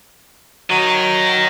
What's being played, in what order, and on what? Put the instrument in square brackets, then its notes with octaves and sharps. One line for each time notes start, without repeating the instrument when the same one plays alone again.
[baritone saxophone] F#3 [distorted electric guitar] A#4 D#5